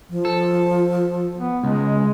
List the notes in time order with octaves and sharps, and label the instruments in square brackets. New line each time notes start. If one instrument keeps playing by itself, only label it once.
[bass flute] F3
[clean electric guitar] A4
[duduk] B3
[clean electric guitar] C#2 [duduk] G#3